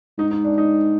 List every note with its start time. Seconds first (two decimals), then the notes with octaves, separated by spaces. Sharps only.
0.18 G#2 D#4
0.31 D#4
0.45 D4
0.58 D#4